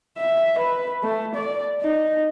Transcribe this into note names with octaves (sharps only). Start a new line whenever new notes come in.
E5
B4
A3
D5
D#4